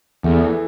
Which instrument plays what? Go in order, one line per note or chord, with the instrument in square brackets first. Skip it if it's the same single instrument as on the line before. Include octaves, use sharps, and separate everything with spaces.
[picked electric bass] E2 [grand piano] A3
[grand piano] E3